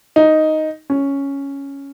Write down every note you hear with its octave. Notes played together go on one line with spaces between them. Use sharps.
D#4
C#4